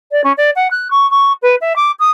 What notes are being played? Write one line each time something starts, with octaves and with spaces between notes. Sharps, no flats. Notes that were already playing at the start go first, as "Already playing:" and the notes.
D5
C#4
D5
F#5
F#6
C#6
C#6
B4
E5
D6
D#6